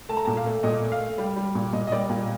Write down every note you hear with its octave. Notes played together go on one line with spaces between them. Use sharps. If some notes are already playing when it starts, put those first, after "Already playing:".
A3 A5
A#5
A#2 A5
F5
A3
A#2 D#5
A3
F5
A3
G3
G3
A#2
A#2 D#5
D#5
G3 D5
A#2